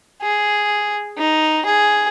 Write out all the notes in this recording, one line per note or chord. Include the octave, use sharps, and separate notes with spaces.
G#4
D#4
G#4